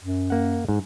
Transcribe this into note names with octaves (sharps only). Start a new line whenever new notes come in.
F#2
A#3 F#5
G#2